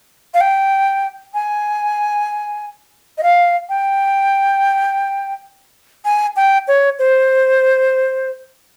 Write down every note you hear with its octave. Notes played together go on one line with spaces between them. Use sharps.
F5
G5
G#5
D#5
F5
G5
G#5
G5
C#5
C5